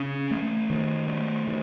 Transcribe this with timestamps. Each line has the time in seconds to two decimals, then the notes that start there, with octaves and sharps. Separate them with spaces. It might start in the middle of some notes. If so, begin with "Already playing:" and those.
Already playing: C#3 C#4
0.31 A3
0.70 D#3
1.08 A3
1.48 D#3